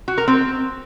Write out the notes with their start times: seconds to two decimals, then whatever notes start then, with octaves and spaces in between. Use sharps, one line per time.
0.08 F#4
0.18 A#4
0.28 C4